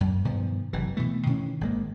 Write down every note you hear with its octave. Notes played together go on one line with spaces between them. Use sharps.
F#2
G2 B2 D#3 F3
F#1 C3 E3
B2 E3 A3
B2 D#3 E3 C#4
G#1 G#3 A#3